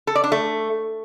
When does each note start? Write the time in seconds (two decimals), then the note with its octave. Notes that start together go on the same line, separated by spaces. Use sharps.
0.07 A4
0.15 D5
0.24 D4
0.32 A3